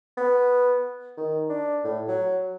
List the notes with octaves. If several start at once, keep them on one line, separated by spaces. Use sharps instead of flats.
B3
D#3
D4
A2
F#3